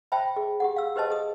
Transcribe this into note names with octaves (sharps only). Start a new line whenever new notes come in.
C5 E5 G5 A5 B5
G#4
G4 G#4 F#5
F5 E6
G4 B4 C5 D#5 A5
G#4 D#6